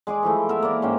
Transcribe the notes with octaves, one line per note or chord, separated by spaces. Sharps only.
G#3 G#4 D5 D6
E3 F3 A3
B3 A#4 E5
A#3 D5
G#2 C#4 C5 G5